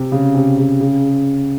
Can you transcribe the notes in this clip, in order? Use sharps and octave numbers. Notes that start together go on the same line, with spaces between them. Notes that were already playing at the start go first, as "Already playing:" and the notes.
Already playing: C3
C#3
C3
C#3
C#3